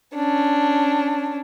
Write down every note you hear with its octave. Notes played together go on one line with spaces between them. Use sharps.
C#4 D4